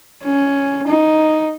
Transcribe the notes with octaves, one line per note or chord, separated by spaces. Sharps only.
C#4
D#4